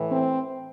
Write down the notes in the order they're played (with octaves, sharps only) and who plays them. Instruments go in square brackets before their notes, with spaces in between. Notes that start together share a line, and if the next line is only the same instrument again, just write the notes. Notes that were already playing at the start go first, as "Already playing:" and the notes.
Already playing: [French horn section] A2 E3
C4